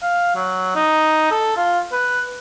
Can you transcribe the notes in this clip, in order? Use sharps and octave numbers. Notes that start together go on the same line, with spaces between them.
F5
F#3
D#4
A4
F4
B4